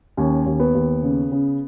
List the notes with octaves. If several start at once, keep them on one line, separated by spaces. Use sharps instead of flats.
D#2 C#4
D#2
B3
D#2
C#3
C#3